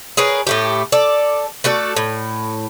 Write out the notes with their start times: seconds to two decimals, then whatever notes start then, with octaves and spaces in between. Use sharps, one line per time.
0.17 G#4 A#4 B4 C#5
0.47 A2 A3 G4
0.92 A4 D5
1.64 A3 F#4 A4 D5
1.96 A2